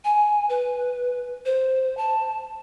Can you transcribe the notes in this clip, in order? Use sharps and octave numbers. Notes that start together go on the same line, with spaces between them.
G#5
B4
C5
A5